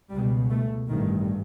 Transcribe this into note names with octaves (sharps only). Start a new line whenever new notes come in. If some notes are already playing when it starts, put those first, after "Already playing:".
C#2 B2 G3
A3
A1 G2 D#3